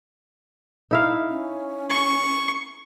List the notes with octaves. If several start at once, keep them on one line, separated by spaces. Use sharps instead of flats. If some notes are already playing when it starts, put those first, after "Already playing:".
D#4 E4 F5
C#4
C#6